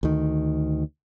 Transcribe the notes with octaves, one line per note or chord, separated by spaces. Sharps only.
D2 D#3